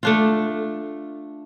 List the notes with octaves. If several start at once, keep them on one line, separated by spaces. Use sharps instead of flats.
A3 D4 F4